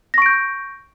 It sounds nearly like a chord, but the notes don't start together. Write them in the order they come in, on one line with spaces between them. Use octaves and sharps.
A#6 C#6 D7 G6